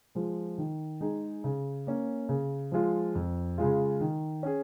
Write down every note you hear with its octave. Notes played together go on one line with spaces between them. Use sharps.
F3 G#3
D#3
G#3 D#4 G#4
C#3
A#3 C#4
C#3
F3 G#3 F4
F2
C#3 G#3 F4
D#3
C#4 G#4